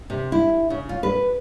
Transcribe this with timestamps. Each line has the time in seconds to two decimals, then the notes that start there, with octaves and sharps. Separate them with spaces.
0.10 C3
0.32 E4
0.70 C#3
0.89 F4
1.03 B4